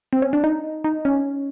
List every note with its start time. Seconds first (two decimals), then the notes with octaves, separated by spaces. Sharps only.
0.13 C4
0.22 C#4
0.33 D4
0.44 D#4
0.84 D#4
1.05 C#4